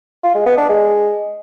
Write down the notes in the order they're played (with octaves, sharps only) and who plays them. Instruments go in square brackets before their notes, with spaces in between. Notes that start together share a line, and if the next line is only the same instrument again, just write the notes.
[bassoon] F4
G#3
B3
D4
G#3